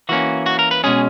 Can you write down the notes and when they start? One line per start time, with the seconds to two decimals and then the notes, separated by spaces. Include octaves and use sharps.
0.09 E3 A#3 C#4 F#4
0.46 F#4
0.59 A#4
0.71 B4
0.84 B2 G#3 C#4 G#4